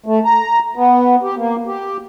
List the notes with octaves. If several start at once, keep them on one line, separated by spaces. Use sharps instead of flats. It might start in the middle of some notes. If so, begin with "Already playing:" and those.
A3
A#5
B3
G4
A#3
G4